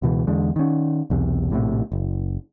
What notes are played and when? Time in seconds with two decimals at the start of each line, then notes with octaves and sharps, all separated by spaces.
0.02 C#2 B2 E3
0.27 E2 D3 G#3
0.56 D#3 C#4
1.10 B1 E2 C3
1.50 A#1 A2 C3
1.92 F#1